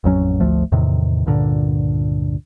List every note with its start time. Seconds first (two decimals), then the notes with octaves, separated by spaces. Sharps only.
0.04 A1 F2 F#3 C#4
0.40 G#1 D2 F3 A3
0.72 E2 A2 C3 D#3
1.26 C#2 G2 A#2 D3